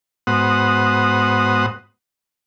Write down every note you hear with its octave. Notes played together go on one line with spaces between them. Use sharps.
G#2 B3 F#4 C5 F#5 D#6